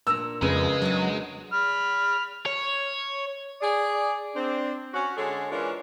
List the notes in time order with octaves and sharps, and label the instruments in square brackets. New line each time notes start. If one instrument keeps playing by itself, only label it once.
[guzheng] A#2 D4 A#5 [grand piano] E6
[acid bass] F2 [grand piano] C#3 [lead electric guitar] G#3 [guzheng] B3 A#4 B4
[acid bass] F#3 [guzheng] D4 D5 G#5
[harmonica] B5 F6
[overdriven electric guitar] C#5
[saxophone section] G#4 D5
C4 D4
C#4 F#4
D3 G#3 C#4 G#4 A4
E3 G#3 C#4 D4 F4 A#4